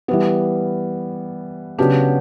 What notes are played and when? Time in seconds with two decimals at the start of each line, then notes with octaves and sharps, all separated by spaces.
0.08 E3 G3 B3
1.78 C#3 F#3 B3 D4 G4